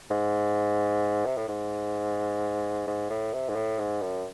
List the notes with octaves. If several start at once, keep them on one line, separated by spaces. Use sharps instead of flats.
G#2
C3
A2
G#2
G#2
A2
C3
G#2
A2
G#2
F#2